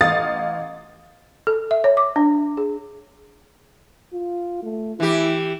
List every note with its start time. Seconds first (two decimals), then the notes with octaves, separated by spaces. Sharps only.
0.01 A1 F5 D#6 A6
1.47 A4
1.71 E5
1.84 C#5
1.97 D6
2.16 D4
2.57 G#4
4.13 F4
4.63 A3
5.00 E3 E4 G4